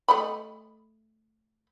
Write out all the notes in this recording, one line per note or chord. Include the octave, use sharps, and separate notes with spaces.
A3 D#5 B5